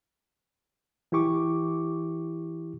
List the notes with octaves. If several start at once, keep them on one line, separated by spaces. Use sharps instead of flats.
E3 E4 G4 C#6 D6